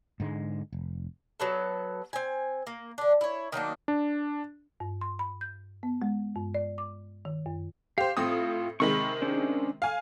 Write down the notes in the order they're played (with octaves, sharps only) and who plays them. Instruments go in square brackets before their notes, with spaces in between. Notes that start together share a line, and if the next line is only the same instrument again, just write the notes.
[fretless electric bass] G#2 D3 G#3
F1
[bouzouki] F#3 B3 A4
C4 G#5
A#3
D3 D4
E4 C#5
D#3 F#3 A#3 D4
[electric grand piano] D4
[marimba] G2
C6
B5
G6
B3
G#3
G2
D5
D6
D#3
F#2
[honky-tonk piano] G4 C5 [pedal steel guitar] F5
[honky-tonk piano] A2 C4 D#6 [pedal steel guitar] F4
[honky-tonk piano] C3 D#3 G#3 [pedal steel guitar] B5 C#6
[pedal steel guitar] C#4 D4 C5
[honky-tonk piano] F5 G#5